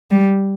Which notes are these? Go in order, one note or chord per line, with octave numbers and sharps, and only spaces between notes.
G3